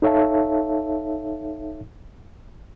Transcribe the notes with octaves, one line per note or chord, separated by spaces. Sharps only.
D#4 A4 C#5 E5 F5 A5